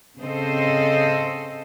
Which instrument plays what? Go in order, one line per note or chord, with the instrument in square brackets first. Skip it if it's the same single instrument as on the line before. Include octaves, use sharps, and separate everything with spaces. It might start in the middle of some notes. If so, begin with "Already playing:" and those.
[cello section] C#3 C4 A4 C5 D#5